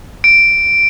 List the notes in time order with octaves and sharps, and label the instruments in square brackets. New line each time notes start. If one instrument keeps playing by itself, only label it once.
[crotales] D7